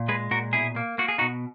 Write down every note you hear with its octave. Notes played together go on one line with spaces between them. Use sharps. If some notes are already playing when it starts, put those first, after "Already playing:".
Already playing: A#2
G#3 G#4 B4
A#2 F#4 A#4
B2 E4 G#4
A#3
A#3 F#4
G#4
B2 D#4 F#4